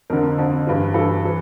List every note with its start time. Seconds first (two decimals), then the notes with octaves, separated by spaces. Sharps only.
0.10 F2 D3 A#4
0.38 F2 D3
0.67 G2 E3
0.94 G2 E3 A4
1.25 E3